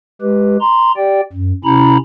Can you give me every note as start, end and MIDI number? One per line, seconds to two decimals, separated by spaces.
0.21 0.57 56
0.21 0.57 67
0.21 0.57 71
0.61 0.92 82
0.61 0.92 84
0.97 1.21 67
0.97 1.21 74
0.97 1.21 79
1.32 1.52 42
1.64 1.97 48
1.64 1.97 61
1.64 1.97 64
1.64 1.97 82
1.64 1.97 83